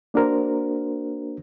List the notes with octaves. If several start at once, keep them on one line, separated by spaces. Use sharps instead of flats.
A#3 D4 F#4 A#4 C5